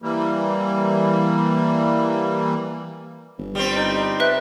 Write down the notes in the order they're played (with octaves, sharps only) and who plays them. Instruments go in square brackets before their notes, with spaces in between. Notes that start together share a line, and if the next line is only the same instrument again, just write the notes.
[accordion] E3 G3 A#3
[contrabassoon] G1
[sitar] G3 C4
[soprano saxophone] D#4
[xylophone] B4 E5 F#6